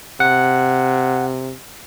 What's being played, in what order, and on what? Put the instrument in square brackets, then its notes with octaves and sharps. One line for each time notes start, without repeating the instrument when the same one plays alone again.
[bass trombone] C3 [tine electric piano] F#5